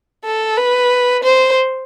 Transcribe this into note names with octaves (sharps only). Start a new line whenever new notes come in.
A4
B4
C5